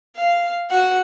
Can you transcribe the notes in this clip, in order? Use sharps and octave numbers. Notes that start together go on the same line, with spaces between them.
F5
F#4 F#5